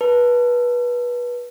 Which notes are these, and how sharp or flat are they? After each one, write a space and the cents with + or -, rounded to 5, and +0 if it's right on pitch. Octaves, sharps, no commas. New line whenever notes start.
B4 -25 A5 +0